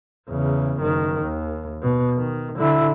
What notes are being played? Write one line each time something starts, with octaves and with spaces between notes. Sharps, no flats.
E2 C#3
F#1 D#3
D#2
B2
D#3
D3 E4